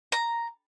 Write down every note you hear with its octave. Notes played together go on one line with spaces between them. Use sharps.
A#5